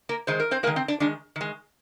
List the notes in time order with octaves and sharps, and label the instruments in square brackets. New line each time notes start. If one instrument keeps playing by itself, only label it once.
[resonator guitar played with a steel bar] A#3 A#4
D#3 G#3 C5
A#4
C4 C5
G#3 A#3 A#4
D#3
C4
D4
D#3 G#3 D4
D#3 G#3